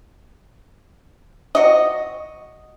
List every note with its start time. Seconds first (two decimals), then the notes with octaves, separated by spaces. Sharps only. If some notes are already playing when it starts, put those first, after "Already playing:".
1.55 F#4 D#5